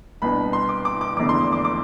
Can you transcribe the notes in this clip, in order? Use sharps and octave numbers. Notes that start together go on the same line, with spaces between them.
C2 B2 B3 D4 B5
C6
D6
D6
D6
F1 E2 D3 D6
C6
D6
D6
D6